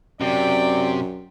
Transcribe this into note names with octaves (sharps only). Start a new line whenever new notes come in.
F#2 C3 D5 G5